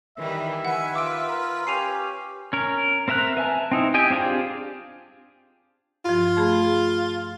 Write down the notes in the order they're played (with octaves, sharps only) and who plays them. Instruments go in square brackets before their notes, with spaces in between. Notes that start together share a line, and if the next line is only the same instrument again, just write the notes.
[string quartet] D#3 E3 G3 [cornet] E5
[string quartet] D#3 G#5 [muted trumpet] B4 [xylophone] F#5
[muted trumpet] F4 [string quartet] B4 [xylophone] D6 D7
[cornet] A#4
[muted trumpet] C#4 [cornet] G4 [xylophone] C7 D#7 F7
[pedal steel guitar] C#4 A#4
C4 A#4 E5 A#5 F#6
B4 E5 G#5 A5
C4 D#4 E4
G4 D#5 G5 G#5
C4 D4 F4 G4 G#4
[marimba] G2 F3 [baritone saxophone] F4
[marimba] A3 G#4 B5